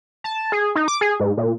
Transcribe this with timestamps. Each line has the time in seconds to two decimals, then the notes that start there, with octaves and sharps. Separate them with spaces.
0.24 A5
0.52 G#4
0.75 D#4
0.88 D6
1.01 G#4
1.20 G#2
1.37 A#2